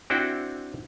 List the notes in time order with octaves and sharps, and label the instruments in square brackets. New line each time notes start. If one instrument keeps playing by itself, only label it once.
[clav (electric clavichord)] C4 D4 E4 F#4 F#5 G5